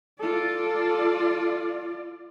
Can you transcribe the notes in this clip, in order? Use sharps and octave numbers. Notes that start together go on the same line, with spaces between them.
F4 A4 D5